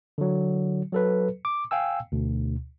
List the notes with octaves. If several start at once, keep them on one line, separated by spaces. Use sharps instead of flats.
D3 F#3
F#3 A4 B4
D6
F5 G5 G#5 E6
D2 B2